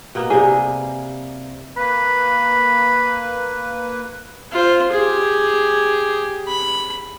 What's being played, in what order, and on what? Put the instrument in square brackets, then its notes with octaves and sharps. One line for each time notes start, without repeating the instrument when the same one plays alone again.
[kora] B2 A#3 B3
[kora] C3 G3 [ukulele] G#4
[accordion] A#3 B4 [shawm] B5
[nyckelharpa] F4 C5
G4 G#4
B5